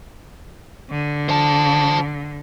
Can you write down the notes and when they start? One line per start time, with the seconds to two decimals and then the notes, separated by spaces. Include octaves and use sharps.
0.90 D3
1.29 C5 A5